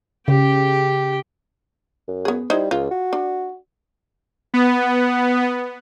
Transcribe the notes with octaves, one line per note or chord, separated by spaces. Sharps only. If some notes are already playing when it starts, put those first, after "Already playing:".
C#3 G4 G5
F#2
B3 G#4
G3 D#4 E4 C5
C#2 F4
F#4
D4
B3